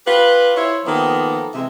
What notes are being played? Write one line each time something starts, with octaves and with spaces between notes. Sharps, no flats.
F4 G4 B4
E4 C5 C#5
D#3 F3 A#3 B3 A4
C3 E3 G#3 E5